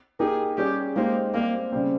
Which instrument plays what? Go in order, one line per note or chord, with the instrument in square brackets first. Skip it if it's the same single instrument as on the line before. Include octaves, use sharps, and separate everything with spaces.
[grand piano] A#3 D#4 G4 A#4 [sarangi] G#4
[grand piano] G3 C#4 G#4 [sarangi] G4
[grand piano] G#3 D#4 G4 C5 [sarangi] A#3
[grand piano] G3 C4 G4 [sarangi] A#3
[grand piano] C#3 G3 C4